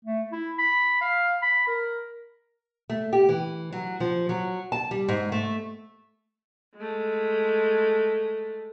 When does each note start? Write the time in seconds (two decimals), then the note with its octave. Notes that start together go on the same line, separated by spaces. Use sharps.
0.05 A3
0.32 E4
0.59 B5
1.01 F5
1.42 B5
1.67 A#4
2.90 A3
3.13 G4
3.29 E3
3.73 F#3
4.00 F3
4.29 F#3
4.72 A5
4.91 G3
5.08 G#2
5.32 A3
6.76 G#3 A3